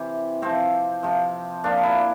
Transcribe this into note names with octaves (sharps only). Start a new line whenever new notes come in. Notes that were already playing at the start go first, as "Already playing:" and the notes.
Already playing: C3 E3 G4
C3 F3 C4
C3 F3
A#2 F3 D4
E4